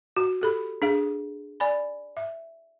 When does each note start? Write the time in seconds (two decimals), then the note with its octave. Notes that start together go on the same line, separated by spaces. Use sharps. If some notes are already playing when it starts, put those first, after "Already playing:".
0.17 F#4
0.41 G4 A4 B5
0.82 D4 G#4 F5
1.60 D5 G#5 B5
2.17 E5